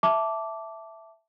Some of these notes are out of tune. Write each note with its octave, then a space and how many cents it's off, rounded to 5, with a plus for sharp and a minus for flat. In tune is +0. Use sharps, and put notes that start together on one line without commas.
E5 +0 A5 +0 D6 -10